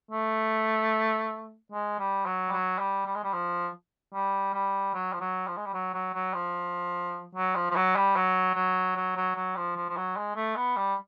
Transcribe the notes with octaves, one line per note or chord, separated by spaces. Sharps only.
A3
G#3
G3
F#3
G3
F#3
G3
G3
G#3
G3
F3
G3
G3
F#3
F3
F#3
F3
G#3
G3
F#3
F#3
F#3
F3
F#3
F3
F3
F#3
G3
F#3
F#3
F#3
F#3
F#3
F3
F3
F3
F#3
G#3
A3
B3
G3